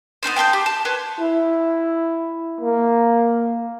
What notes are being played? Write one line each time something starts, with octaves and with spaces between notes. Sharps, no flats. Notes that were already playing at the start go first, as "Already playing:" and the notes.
B3 C#4 D#4 C5
G5 A5 C6 G6
G4
A5
B4 C#5 C6
E4
A#3